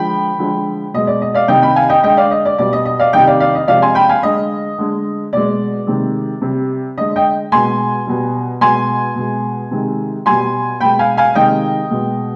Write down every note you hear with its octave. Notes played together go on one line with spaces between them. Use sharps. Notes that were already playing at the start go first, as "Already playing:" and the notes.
Already playing: D3 F3 G#3 G5 B5
D3 F3 G#3
B2 G#3 D#5
D5
D#5
D5 F5
C3 D#3 G3 D#5 G5
G5 B5
F5 G#5
D#5 G5
D3 G#3 D#5 G5
D5 F5
D#5
D5
B2 G3 D5
D#5
D#5
D5 F5
C3 D#3 G3 D#5 G5
D5 F5
D5 F5
D#5
C3 F3 G#3 D5 F5
G#5 C6
G5 B5
F5 G#5
D3 G#3 D#5
D3 G#3
B2 G#3 D5
C3 D#3 G#3
C3 G3
D3 G#3 D#5
D#5 G5
B2 G#3 G#5 C6
B2 G3
B2 G#3 G#5 C6
B2 G#3
C3 D#3 G#3
B2 G3 G#5 C6
B2 G#3 G5 B5
F5 G#5
F5 G#5
C3 D#3 G#3 D#5 G5
B2 G#3